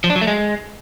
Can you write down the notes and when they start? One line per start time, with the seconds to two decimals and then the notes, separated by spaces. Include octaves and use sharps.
0.04 F3
0.10 D4
0.16 F#3
0.21 A3
0.27 G#3